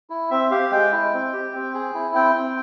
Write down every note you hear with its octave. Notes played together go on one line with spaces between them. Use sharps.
E4
C4 E5
G4 F5
G#3 G5
E4
C4
G4
C4
G#4
E4
C4 G5
C4